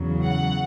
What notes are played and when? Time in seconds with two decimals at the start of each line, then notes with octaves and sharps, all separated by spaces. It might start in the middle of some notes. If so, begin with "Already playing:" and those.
Already playing: E2 C#3 F#3
0.24 F#5